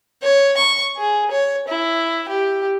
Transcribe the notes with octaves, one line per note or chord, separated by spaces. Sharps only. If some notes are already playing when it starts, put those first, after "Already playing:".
C#5
C#6
G#4
C#5
E4
G4